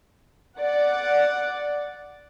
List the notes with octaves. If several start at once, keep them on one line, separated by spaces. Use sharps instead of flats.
D5 F#5